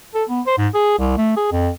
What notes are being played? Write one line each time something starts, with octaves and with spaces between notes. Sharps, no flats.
A4
B3
C5
G#2
G#4
C2
A3
G#4
F2